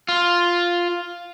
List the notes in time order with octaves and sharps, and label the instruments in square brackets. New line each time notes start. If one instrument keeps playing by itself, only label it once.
[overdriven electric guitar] F4